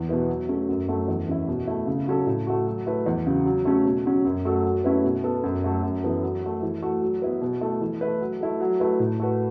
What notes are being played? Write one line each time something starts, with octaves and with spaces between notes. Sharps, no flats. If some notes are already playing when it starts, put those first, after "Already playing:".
Already playing: E2
B2 B3 E4 B4
F#3
A3 C#4 A4
F#2
F#3 A3 C#4 A4
E2
E3 C#4 E4
B2
A3 E4
C#3
F#3 C#4 A4
A2
A3 F#4
F#3
A3 E4 B4
E2
C#3 F#3
F#3
A3 C#4 A4
B2
F#3 C#4
F#2
F#3 A3 F#4 A4
F#3
A3 C#4 E4 B4
B2
B3 A4
F#2
F#3 A3 F#4 A4
F#2
E3 B3 A4
F#3
A3 F#4
E3
A3 F#4
F#3
B3 E4 B4
B2
A3 E4 A4
E3
A3 E4 B4
F#3
A3 E4 A4
F#3
A3 E4 B4
A2
A3 F#4 B4